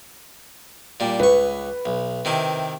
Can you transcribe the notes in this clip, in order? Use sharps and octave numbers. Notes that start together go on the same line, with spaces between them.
A#2 G3
C#2 B4 C#6
B1
C3 D#3 E4